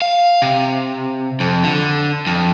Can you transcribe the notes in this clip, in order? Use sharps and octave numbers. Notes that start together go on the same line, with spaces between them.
F5
C3
F2
D3
F2